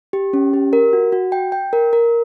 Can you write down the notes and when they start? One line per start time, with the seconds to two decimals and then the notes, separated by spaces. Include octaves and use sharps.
0.13 G4
0.33 C#4
0.53 G4
0.73 A#4
0.93 F#4
1.12 F#4
1.32 G5
1.52 G5
1.73 A#4
1.93 A#4